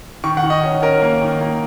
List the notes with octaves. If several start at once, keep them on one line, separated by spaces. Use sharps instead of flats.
D#3 C#6
F#5
D#3
D#5
C#4
C#4 A#4
A#3
D#3
A#3